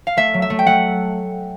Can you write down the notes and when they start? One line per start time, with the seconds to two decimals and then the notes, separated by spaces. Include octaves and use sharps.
0.07 F5
0.17 A3 E5
0.34 F#3
0.42 E5
0.50 A3
0.59 G5
0.67 A3 F#5